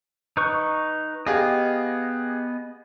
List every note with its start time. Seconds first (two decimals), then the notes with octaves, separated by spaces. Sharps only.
0.37 D#4 B4 C#6
1.26 B3 G4 G#4 D#5 F5